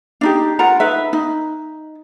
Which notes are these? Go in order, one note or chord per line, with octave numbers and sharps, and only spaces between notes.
D4 D#4 G4
F4 A#4 F#5 A#5
D#4 B4 E5
D#4